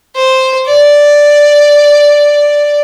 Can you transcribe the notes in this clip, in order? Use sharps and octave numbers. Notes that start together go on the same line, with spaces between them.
C5
D5